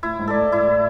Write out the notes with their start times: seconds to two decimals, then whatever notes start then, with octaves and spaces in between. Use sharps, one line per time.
0.03 A2 E4
0.19 G#2
0.28 A4 D5
0.36 A2
0.52 A2 E4